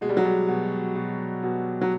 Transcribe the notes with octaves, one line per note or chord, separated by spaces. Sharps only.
B2 G#3
G3
F#3
G3
B2
B2
B2
F#3